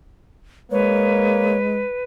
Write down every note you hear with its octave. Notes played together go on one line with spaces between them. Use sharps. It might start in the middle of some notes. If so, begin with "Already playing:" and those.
G#3 A#3 B4 C#5